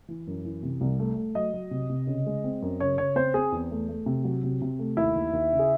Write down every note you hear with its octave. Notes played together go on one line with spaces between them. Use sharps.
E3
F#2
E3
C3
C2
A3
A3
F#3 D#5
F#3
C3
C3
C#3
G#3
C4
F#2
C#3 C#5
C#3 C#5
C4 C5
C4 G#4
E2
A3
A3
C3
F#3
C3
C3
A3
D#2 E4
D#2
D#2
C#3
G#4